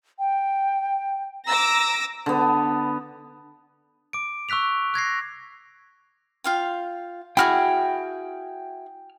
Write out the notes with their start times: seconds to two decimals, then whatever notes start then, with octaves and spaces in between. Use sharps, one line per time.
0.19 G5
1.47 A#5 D6 E6 A#6
2.26 D3 B3
4.13 D6 D7
4.49 C#6 E6 F#6 B6 F7
4.94 F#6 G#6 A#6 C7
6.44 F4 F5 G5
7.37 E4 F#4 G#4 G5 F6